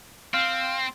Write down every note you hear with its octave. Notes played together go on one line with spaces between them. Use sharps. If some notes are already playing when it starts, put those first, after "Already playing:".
C4 F5